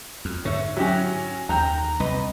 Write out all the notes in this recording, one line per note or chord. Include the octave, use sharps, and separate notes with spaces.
F2
G#2 D3 C#5 E5
F#3 C#4 E4 G4 F#5
D#2 A4 G5 A#5
C2 B4 D#5